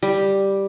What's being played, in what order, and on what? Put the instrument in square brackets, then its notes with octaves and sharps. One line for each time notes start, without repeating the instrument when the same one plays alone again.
[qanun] G3